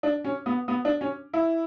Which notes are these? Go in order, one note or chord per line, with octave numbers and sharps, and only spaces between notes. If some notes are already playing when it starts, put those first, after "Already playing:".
D4
C#4
B3
B3
D4
C#4
E4